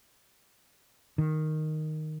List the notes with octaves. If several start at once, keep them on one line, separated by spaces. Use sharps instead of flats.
D#3